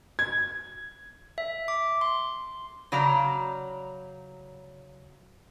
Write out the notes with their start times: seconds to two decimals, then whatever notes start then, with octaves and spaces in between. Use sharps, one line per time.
0.19 G#6
1.38 E5
1.68 D6
2.01 C6
2.92 C#3 F#3 D5 A#5